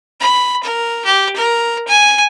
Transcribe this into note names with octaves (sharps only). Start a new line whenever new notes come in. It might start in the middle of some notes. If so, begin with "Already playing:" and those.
B5
A#4
G4
A#4
G#5